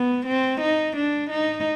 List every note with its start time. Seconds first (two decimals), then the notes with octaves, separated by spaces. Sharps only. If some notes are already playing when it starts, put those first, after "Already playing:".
Already playing: B3
0.26 C4
0.61 D#4
0.96 D4
1.30 D#4